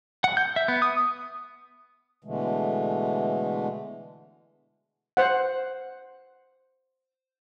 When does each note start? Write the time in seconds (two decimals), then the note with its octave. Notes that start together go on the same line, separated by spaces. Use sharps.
0.24 F#5
0.37 G6
0.56 E5
0.68 B3
0.82 D#6
2.24 B2 D3 E3 G#3 A3
5.17 C5 F#5